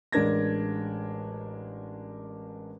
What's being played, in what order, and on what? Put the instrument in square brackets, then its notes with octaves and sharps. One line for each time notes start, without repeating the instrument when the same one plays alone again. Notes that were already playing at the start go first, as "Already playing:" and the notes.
[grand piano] A1 G#3 D4 A#4 G#6 A#6